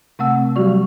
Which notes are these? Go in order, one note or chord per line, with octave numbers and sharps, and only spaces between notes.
C3 A3 C4 F#5 A5 E6
F#3 G3 F#4 G4 D5 C#6